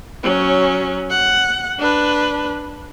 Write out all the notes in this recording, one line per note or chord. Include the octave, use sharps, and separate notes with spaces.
F#3 C#4
F#5
D4 B4